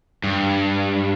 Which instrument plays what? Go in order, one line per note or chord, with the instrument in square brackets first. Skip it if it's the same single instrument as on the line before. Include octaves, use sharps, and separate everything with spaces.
[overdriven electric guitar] G2